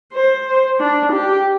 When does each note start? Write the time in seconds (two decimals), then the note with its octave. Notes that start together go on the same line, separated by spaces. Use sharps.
0.14 C5
0.80 D4
1.13 G4